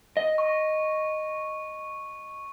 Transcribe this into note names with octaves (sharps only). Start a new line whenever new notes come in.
D#5
C#6